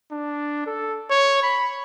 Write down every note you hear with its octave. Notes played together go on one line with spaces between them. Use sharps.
D4
A4
C#5
B5